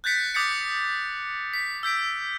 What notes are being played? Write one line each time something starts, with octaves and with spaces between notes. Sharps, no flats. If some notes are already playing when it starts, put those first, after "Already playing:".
F#6 G6 A6 B6 C#7
D6 D#6 G6 A6 B6 C#7
B6
E6 G6 B6 D7